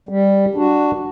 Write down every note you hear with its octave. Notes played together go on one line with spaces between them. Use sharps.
G3
D4 F#4